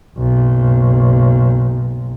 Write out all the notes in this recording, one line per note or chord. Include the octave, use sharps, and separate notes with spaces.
F#1 B1